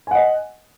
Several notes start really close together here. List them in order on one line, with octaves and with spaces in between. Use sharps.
G#5 F#5 D#5